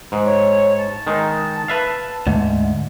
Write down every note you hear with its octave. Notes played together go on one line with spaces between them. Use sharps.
G#2
C#5
A5
D#3 G#3 D#4
B4 E5 F5
D2 G#2